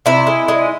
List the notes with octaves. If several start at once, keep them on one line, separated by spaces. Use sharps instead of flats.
C3 E4
G#3
G#3